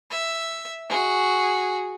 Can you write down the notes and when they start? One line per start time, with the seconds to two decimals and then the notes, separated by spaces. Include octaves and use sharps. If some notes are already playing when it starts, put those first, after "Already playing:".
0.11 E5
0.89 F#4 G#4